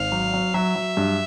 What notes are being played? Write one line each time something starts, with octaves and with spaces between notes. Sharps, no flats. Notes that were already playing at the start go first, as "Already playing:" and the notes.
Already playing: G#1 F5
F#3
F#3
F#3 E5
F#3
G2